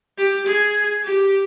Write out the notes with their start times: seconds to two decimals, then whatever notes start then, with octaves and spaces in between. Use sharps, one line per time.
0.18 G4
0.47 G#4
1.03 G4